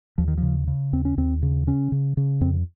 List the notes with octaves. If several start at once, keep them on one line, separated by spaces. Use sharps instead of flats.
D#2 F3
D#3
C#3 F3
C#3
D#2 C4
C#4
D#2 C4
C#3
C#3 C#4
C#3
C#3
F2 C4